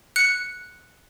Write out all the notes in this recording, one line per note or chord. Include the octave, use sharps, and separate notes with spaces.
F#6 C#7